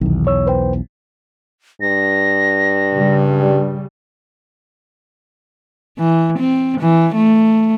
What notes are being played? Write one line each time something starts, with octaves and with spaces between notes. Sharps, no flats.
B1 E2 C3 D#3
C#5 E6
B4 C5 G5
G2 A#6
C#3 G3
E3
C4
E3
A3